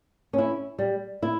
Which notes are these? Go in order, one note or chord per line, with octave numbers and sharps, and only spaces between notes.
C#4 E4
G3
E4